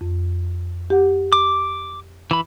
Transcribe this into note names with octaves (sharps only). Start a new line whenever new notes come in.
F2
G4 F#5
D6
E3 B5